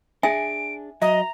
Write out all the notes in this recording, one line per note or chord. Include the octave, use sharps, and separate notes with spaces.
D4 G#4 E5 G#5 D7
F#3 D#5 E5 A#5